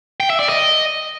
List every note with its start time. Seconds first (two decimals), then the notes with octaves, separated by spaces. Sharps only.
0.20 G5
0.30 E5
0.40 D5
0.49 D#5